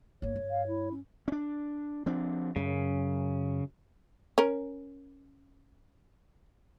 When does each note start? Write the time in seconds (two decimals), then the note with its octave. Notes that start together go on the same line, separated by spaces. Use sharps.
0.22 G1 A#3 C#5
0.36 G2
0.50 F5
0.68 E4
0.91 C#4
1.28 C#4 D4
2.06 F3 C4 D4
2.56 F#2 C#3
4.38 C#4 A#4